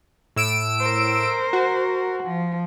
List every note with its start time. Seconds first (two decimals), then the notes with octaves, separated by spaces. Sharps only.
0.36 A2 E6 D7
0.80 A#4 C5
1.53 F#4
2.23 F3